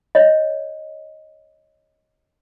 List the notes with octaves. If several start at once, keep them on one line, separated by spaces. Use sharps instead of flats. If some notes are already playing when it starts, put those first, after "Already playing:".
C#5 D#5